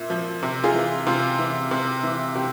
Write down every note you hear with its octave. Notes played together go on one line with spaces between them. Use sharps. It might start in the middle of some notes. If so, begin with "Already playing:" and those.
Already playing: A#2 E5
F3
C3
F4 G#4
E3
C3 F4
E3
C3
E3
C3 G4